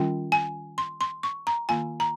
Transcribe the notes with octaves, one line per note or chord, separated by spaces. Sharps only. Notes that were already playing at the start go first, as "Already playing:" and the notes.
Already playing: D#3 G3 C#4 F4 G5
G#5
C6
C6
C#6
A#5
D#3 A#3 F4 G#5
A#5